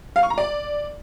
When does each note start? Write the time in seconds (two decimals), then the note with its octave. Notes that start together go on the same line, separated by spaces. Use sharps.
0.16 F5
0.23 C#6
0.30 A#5
0.38 D5